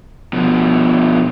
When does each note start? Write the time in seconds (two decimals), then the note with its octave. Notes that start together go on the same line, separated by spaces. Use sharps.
0.33 B2 F3